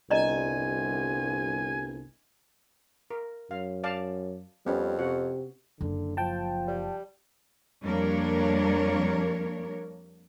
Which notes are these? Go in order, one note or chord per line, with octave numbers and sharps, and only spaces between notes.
G1 C2 D5 D#5 G#5 A#5
A#4
F#2 F5
D5 F5 A5
F2 G3 B3 C#4
C3 F#4 F#5
F#1 D3
F3 G5 A5
G3
F2 G3 A#3 D4 A#4 C#5